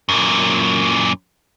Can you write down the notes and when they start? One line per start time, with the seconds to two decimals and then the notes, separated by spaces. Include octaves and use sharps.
0.09 F#2 A#2